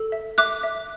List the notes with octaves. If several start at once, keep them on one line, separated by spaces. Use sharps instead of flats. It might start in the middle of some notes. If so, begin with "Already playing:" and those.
Already playing: A4
E5
E5 D6 F#6
E5